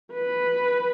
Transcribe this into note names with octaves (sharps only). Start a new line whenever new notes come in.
B4